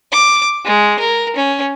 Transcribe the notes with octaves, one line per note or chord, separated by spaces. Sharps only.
D6
G#3
A#4
C#4